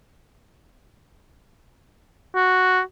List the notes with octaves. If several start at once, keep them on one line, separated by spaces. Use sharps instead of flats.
F#4